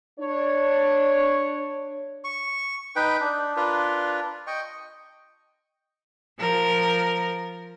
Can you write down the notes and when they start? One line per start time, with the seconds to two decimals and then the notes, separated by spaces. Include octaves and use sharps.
0.20 D4 C#5
2.24 C#6
2.96 D#4 B4 G5
3.20 D4
3.57 D4 F4 A#4 B4
4.47 D#5 G5 C#6
6.40 F3 A#4